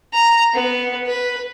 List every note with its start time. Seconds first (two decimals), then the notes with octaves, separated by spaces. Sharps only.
0.13 A#5
0.54 B3
1.06 B4